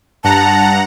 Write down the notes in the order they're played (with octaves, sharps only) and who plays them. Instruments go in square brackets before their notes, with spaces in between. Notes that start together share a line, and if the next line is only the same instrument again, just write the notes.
[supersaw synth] G2 F#5 A#5 [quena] A5